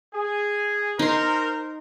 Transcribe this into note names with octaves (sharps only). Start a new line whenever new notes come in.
G#4
D#4 A#4 C5 C6